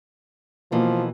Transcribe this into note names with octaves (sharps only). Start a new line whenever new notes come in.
B2 E3 F3 A#3